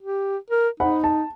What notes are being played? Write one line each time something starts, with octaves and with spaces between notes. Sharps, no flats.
G4
A#4
D#4 C5 F#5 B5
A5